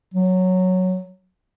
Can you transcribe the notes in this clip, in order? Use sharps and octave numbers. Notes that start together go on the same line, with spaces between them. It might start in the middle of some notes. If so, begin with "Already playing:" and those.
F#3